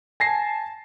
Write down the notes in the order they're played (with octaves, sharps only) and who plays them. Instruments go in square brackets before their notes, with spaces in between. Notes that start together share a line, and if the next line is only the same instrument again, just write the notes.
[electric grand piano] G#5 A#6 C7 [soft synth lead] A5